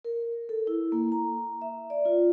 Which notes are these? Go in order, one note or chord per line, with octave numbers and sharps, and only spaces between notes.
A#4
A4
E4
A#3
A#5
E5
D5
F4